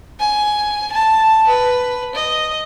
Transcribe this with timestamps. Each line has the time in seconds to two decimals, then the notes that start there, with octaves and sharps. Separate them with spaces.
0.20 G#5
0.92 A5
1.48 B4
2.15 D#5